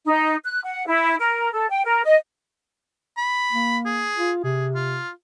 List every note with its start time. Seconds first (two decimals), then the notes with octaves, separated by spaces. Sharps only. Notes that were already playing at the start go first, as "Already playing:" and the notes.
0.05 D#4
0.45 F#6
0.64 F#5
0.87 E4
1.19 A#4
1.53 A4
1.70 G5
1.86 A#4
2.05 D#5
3.18 B5
3.52 A#3
3.86 G#4
4.17 F4
4.44 C3 G#4
4.75 F4